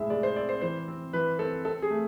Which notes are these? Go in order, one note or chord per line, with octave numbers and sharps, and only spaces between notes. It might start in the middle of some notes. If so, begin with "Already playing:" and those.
Already playing: A2 C3 G#3 E5
G#3 D5
C5
C4 D5
C5
E3 C5
C4
E3 B4
C4 A4
C4 A4
G#4
A3